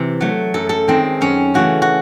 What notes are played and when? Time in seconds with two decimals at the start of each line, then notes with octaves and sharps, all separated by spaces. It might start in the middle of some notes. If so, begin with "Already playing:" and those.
Already playing: C3 E3
0.21 F#3 A3
0.54 F#2 A4
0.69 A4
0.88 D#3 G#3 C4
1.21 F#2 C#4
1.54 C#3 E3 A3 F#4
1.82 F#4